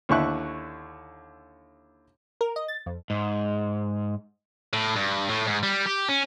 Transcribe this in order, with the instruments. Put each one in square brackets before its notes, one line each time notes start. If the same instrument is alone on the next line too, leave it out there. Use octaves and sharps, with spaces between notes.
[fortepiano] D#2 D3 E4 C#6 F#6
[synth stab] A#4
D#5
A6
F2
[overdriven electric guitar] G#2
[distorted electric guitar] A2
G2
A2
G#2
G3
G4
C#4